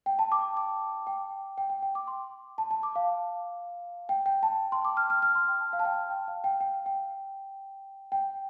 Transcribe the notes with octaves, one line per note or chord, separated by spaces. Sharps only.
G5
A5
D6
D6
G5
G5
G5
G5
D6
C6
A5
A5
D6
F5
G5
G5
A5
C6
D6
F6
F6
F6
C6
G5
A5
F5
A5
G5
G5
F5
G5
G5
G5
G5